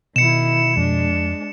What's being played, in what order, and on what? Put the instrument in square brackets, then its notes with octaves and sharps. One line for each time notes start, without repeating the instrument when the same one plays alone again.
[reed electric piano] B2 [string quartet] D#3 E4 [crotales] C#7 E7
[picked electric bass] F2 F3 [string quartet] G#3 D4